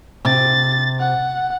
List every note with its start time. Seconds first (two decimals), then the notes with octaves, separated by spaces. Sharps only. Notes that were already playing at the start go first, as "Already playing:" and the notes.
0.25 C3 A6
1.00 F#5